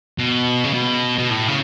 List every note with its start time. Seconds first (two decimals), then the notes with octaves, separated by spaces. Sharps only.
0.18 B2
0.64 C#3
0.73 B2
1.18 B2
1.30 A2
1.48 C#3